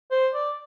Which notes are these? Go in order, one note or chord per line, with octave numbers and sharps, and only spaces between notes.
C5
D5